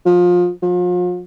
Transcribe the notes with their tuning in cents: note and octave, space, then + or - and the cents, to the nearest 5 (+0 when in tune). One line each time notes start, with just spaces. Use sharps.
F3 +25
F3 +40